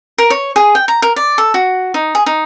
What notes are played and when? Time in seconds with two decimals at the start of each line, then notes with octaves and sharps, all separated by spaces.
0.18 A#4
0.30 C#5
0.56 G#4
0.75 G5
0.88 A#5
1.02 A#4
1.16 D5
1.38 A4
1.54 F#4
1.94 D#4
2.15 G#4
2.26 D#4